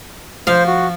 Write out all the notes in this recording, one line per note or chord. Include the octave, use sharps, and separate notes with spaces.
F3 C5 F5
F#4